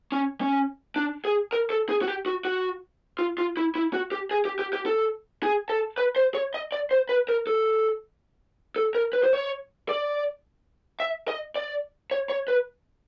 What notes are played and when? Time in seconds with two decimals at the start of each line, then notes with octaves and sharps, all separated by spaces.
0.12 C#4
0.41 C#4
0.96 D4
1.25 G#4
1.53 A#4
1.70 A4
1.89 G#4
2.02 F#4
2.08 G4
2.26 F#4
2.45 F#4
3.19 F4
3.38 F4
3.57 E4
3.75 E4
3.93 F#4
4.12 G4
4.31 G#4
4.45 G4
4.59 G4
4.73 G4
4.86 A4
5.43 G#4
5.70 A4
5.98 B4
6.16 C5
6.35 C#5
6.54 D#5
6.72 D5
6.91 C5
7.09 B4
7.29 A#4
7.47 A4
8.76 A4
8.95 A#4
9.13 B4
9.24 C5
9.33 C#5
9.89 D5
11.00 E5
11.28 D#5
11.56 D5
12.11 C#5
12.30 C#5
12.48 B4